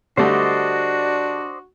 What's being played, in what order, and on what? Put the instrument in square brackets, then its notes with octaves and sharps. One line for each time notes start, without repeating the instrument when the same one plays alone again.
[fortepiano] D3 G3 A3 [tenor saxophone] D4 [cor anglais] F#4 [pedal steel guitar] C5 D5 D#5